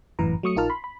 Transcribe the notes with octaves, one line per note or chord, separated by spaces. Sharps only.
G1 F#2 A2 E3 B4 A#5
F#3 A3 C#6 D#6 C#7
A#1 D#4 F4 A#4 A5 F6
B5 C6
B5